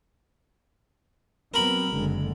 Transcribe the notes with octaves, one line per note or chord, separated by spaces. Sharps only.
F#3 B3 C4 A#4 B5
F#1 D3 G#3